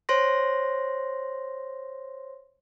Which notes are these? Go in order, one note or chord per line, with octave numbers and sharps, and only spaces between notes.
C5 C#5 C6 A#6